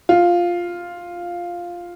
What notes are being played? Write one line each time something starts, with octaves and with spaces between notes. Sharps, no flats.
F4